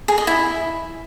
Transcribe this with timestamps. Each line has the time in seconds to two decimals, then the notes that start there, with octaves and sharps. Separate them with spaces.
0.08 G#4
0.18 D#5
0.27 E4